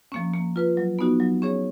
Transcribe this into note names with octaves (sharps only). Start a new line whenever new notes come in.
F3 A#3 C#4
A#3
F4 B4
F#3
B3 D#4 F#4
F#3
C#4 G#4 C#5